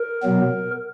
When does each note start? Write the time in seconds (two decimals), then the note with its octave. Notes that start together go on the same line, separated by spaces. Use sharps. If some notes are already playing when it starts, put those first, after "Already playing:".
Already playing: A#4
0.23 B2 F#3 B3